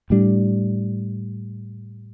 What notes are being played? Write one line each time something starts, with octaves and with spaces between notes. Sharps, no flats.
A2 G3 D4